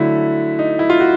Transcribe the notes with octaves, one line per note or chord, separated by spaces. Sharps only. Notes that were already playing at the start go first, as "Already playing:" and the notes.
Already playing: D3 F#3 A3 E4
D#4
E4
F4
F#4